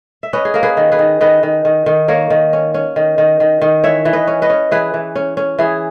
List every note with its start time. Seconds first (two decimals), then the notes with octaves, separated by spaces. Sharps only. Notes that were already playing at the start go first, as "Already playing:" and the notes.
0.23 E5
0.33 C#4 B4 D#5
0.45 G#4
0.54 A#3 A#4
0.63 G#4 B4
0.77 D#3
0.92 G#4 B4
0.99 D#3
1.21 D#3 B4 D#5
1.43 D#3
1.65 D#3
1.86 D#3
2.08 A#3 A#4 C#5
2.30 D#3
2.53 C#4
2.74 C#4
2.96 D#3
3.18 D#3
3.40 D#3
3.62 D#3
3.84 E3 C#5 E5
4.05 E3
4.13 B4 D#5
4.27 C#4
4.42 B4 D#5
4.50 C#4
4.71 E3 G#4 B4
4.94 E3
5.15 C#4
5.37 C#4
5.59 E3 E4 G#4